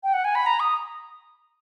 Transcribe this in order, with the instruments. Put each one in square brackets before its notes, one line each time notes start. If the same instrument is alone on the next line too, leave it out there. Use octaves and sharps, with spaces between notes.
[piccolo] G5
F#5
G#5
B5
A#5
D#6